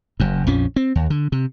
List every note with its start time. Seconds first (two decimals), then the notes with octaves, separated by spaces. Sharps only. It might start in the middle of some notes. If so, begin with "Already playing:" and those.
0.20 F#1 F#2
0.47 A#1 F2 F3 C#4
0.76 C4
0.95 D#2
1.10 D3
1.32 C3